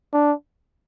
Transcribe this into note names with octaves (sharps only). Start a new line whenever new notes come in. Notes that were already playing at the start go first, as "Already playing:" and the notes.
D4